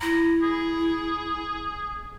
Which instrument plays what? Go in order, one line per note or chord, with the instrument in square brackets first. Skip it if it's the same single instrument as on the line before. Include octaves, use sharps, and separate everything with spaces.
[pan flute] E4 [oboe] A#5
[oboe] G#4